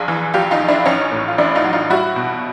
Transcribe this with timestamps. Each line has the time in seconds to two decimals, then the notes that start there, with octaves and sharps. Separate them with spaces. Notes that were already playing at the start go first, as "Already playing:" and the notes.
Already playing: A#1 G#4
0.08 E3
0.34 A#1 F4 G4
0.51 D#4 F4
0.60 A#1
0.68 D4 E4
0.86 A1 C#4 D#4
1.12 A2
1.28 F4
1.38 A1 D4 E4
1.55 D#4 F4
1.64 F#3
1.73 D#4 F4
1.90 G3 E4 F#4
2.16 B2